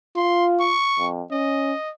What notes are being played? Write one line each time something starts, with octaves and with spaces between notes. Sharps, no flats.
F4 C6
C#6
F2
C#4 D#5